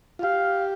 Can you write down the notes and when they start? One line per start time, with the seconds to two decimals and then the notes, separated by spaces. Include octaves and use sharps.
0.19 F4
0.23 G4 F5